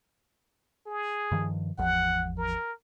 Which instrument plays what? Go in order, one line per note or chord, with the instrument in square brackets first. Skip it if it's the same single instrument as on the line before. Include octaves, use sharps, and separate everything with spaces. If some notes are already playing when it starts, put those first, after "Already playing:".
[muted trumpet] G#4
[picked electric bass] G2 D#3 F3
[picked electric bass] G#1 E2 F3 [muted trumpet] F#5
[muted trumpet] A#4